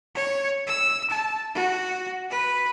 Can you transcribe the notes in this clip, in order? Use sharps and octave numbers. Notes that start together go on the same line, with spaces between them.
C#5
E6
A5
F#4
B4